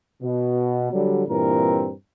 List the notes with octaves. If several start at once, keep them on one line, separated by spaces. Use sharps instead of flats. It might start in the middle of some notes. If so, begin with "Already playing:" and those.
B2
D3 F#3 G3
G2 A#2 E3 C4 A#4